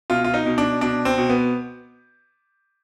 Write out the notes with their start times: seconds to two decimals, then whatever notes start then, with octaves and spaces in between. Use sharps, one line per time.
0.10 B2 F4
0.24 F4
0.34 D#4
0.46 B2
0.58 D4
0.81 B2 D4
1.05 C4
1.18 B2
1.29 B3